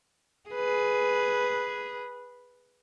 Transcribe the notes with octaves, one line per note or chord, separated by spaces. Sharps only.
G#4 B4